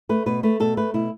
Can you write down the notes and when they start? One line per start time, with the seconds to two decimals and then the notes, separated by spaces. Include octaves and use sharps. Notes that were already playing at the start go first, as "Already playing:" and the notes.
0.09 A3 B4
0.26 B2 B4
0.43 A3 B4
0.60 B2 A4
0.77 A3 B4
0.94 B2 E4